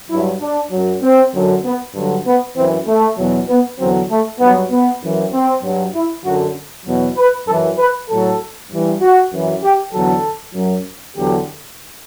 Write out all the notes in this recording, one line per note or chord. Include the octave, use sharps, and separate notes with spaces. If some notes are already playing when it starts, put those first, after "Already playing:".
G2 F#3 E4
D4
F#2 F#3
C4
F#2 D3 F#3
B3
G2 D3 F#3
B3
F#2 E3 C4
A3
E2 B2 F#3
B3
E2 D3 F#3 C4
A3
G2 F#3 B3
B3
F#2 E3
C4
G2 F#3
E4
F#2 D3 F#3 F#4
E2 B2 F#3
B4
F#2 E3 A4
B4
A2 F#3 A4
G2 E3
F#4
F#2 E3
G4
E2 D3 F#3 A4
F#2 F#3
E2 D3 F#3 G4